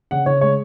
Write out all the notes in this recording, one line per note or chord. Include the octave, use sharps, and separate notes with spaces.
C#3 F#5
C#3 C#5
G#3 C#5